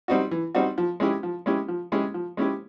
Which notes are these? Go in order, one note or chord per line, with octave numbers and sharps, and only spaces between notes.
G3 C4 D#4 F#4
E3
G3 C4 D#4 F#4
F3
G#3 C#4 E4 G4
F3
G#3 C#4 E4 G4
F3
G#3 C#4 E4 G4
F3
G#3 C#4 E4 G4